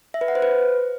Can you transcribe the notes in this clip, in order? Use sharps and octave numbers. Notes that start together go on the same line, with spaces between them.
E5
B4
F#5
C5
B4